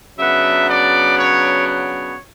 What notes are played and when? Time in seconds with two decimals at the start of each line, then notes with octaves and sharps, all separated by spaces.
0.18 C#3 F#3 B3 D4 E5
0.68 D5
1.17 C#5
1.67 C#5